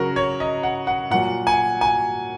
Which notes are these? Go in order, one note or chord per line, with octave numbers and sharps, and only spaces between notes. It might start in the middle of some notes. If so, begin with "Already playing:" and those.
Already playing: C#3 F#3 F#4 A#4
C#5
D#5
F#5
F#5
A#2 F#3 F#5
G#5
G#5